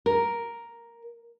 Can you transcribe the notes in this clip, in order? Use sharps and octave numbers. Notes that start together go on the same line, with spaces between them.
A#4